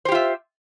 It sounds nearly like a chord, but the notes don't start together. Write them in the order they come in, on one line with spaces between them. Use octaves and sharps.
C5 G4 F4 E5